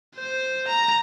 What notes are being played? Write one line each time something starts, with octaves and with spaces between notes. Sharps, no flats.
C5
A#5